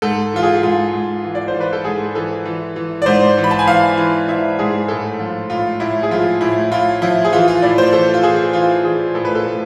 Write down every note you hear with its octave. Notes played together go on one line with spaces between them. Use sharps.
G#2 A4
E3 F4
G#4
G#2 F4
G#2
E3
D5
C5
E3
B4
A4
G#2 G#4
E3 A4
E3
E3
D5
G#2 C5
E3
B5
A5
G#5
E3 F5
E3
E3 E5
G#2 G#4
A2 A4
F3 F4
A2 F4
A2 E4
G#4
F3 F4
A2 E4
A2 F4
F3 E4
G#4
E3 F4
F4
A2 D5
C5
E3 A4
F4
E3 G#4
E3 F4
E3 G#4
A2 A4
B4
A4
A2